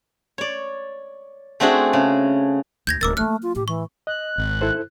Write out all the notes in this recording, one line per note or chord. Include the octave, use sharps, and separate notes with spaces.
C#5 D5
A3 C4 D4 F#4 G#4
C#3
D#2 G6 G#6 A#6
D1 C#4 A#4 D6 E6 A6
F#3 A3 A#3 F6 F#6
F4
A2 G4
E3 C#6
D#5 F#6
G#1
E4 A4 C5